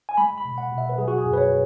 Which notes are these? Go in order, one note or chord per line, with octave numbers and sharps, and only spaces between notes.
G#5
G#3 B5
B5
B2
F#5
B2
E5
B4
F#3 G#4
F#4
G#4
F#2
B4
C#5